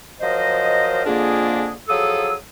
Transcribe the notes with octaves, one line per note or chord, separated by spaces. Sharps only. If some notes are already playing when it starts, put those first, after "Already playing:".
F3 F#3 A#4 C5 D#5
F2 D3 A#3 D4 F4 G#4
F3 F#3 G#4 A4 D#6 E6